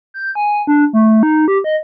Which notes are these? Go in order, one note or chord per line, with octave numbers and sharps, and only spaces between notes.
G6
G#5
D4
A3
D#4
G4
D#5